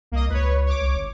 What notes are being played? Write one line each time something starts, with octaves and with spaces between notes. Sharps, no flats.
C2 A#3 D#5
C#2 B4 C#5
C#5 D6
C2
G1